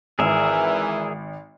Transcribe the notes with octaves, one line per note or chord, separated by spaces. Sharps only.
G#1 E3 G#4 A#4 E5 E6